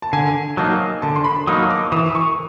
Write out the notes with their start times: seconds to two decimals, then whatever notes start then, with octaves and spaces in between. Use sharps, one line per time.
0.02 A5
0.13 D3 G#5
0.57 F#3 A#3 D#4 A5
1.02 D3 A5
1.16 C6
1.24 B5
1.47 F#3 A#3 D#4 D#6
1.70 D6
1.92 E3 D#6
2.15 C#6